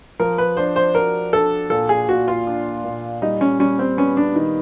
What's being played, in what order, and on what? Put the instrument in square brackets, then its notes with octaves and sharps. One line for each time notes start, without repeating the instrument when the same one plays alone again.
[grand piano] F3 [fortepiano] A#4
[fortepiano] B4
[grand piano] D4 [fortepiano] C5
[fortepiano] C5
[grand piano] F#4 [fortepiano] A#4
[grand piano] D4 [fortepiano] A4
[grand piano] A#2 [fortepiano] A4
[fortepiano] G#4
[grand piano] A#2 [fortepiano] F#4
[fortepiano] F4
[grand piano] D4
A#2
[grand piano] G3 [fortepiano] D#4
[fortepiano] C#4
[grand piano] G3 [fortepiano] C#4
[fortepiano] C4
[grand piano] B3 [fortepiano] C#4
[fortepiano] D4
[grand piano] D#3